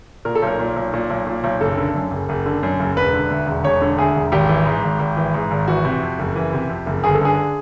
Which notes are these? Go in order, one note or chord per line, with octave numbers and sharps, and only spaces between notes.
A#2 A#4
A4
B1 A#4
A#2
B1
A#2
B1
A#2
B1
F#1 A4
D3
F#2
F#1
F#1
D3
F#2
F#1
E1 B4
D3
D2
E1
E1 C#5
D3
D2 G#4
E1
G#1 G4
E3
G#2
G#1
G#1
E3
G#2
G#1
E3 F#4
C3
F2
F#1
E3
C3
F2
F#1
G1 G#4
A4
D3 G#4